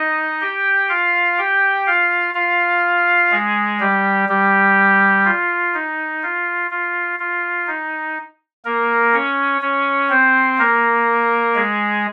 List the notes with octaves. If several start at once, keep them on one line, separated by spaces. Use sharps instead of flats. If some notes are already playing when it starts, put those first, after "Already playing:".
Already playing: D#4 D#5
G4 G5
F4 F5
G4 G5
F4 F5
F4 F5
G#3 G#4
G3 G4
G3 G4
F4
D#4
F4
F4
F4
D#4
A#3 A#4
C#4 C#5
C#4 C#5
C4 C5
A#3 A#4
G#3 G#4